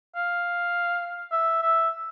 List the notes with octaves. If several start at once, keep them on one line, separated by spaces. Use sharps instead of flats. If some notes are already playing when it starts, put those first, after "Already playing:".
F5
E5
E5